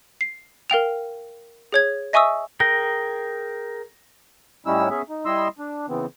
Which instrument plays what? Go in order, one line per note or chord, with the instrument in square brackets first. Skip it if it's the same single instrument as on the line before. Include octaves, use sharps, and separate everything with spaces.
[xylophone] C7
A#4 F5 G5 F7
G#4 C#5 G#6
D#5 E5 G#5 C#6 D#6 E6
[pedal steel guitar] G#4 A#4 G5 [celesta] A#6
[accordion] A2 G3 C#4 D#4 E4 E6
B3 C#4 G#4 E5
D#4
G3 E4 D#5 C6 E6
D4
C#3 E3 B3 C4